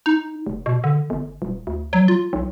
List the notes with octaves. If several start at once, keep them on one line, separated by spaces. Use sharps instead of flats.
D#4
F1
B2
D3
G1
D#1
D2
F#3
F4
B1